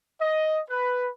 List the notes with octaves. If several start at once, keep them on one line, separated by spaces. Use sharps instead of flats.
D#5
B4